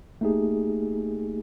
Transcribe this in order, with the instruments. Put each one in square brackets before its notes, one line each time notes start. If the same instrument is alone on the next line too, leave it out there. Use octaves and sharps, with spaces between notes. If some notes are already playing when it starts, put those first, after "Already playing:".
[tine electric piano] A3 A#3 D#4 G4 G#4